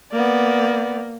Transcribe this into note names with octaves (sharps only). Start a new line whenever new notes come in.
A#3 B3 D5